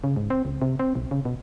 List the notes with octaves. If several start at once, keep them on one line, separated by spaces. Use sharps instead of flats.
C#3
G#2
C4
C#2
C3
C4
B1
C#3
B2